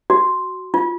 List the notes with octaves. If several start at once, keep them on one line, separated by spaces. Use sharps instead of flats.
F#4
F4